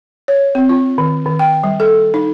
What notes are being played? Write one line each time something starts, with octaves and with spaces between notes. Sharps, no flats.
C#5
C4
F4
D#3
D#3
G5
G3
A4
D#4